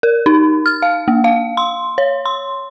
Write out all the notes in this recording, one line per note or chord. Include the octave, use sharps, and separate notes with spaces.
A#4
D#4
F6
F5
A#3
F5
C6
C#5
C6